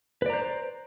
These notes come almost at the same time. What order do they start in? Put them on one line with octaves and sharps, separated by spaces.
B4 D5 A#5 C5